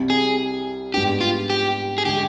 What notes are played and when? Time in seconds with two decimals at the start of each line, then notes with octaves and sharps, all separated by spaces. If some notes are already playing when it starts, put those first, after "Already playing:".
Already playing: C2 C3 G3
0.10 G#4
0.94 G#2 G3 B3 D4 G4
1.21 F4
1.50 G4
1.98 G#4
2.05 D3 G#3 G4